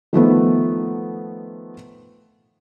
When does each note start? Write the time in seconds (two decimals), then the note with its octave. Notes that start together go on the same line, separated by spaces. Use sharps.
0.13 D#3 F3 A3 B3